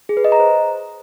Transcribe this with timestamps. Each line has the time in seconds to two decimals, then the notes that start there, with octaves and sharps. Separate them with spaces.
0.09 G#4
0.17 B4
0.24 D#5
0.32 A#5
0.40 C5